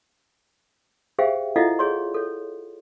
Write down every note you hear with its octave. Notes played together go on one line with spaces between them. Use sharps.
G4 G#4 C5 E5 F5 G5
E4 F4 A4 D#5 F5 F#5
G#4 C#5 C6
A4 C#5